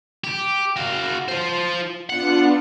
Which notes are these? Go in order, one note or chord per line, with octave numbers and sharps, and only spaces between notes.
G4
F#4 F5
F4 C5
B3 D4 F4 F#5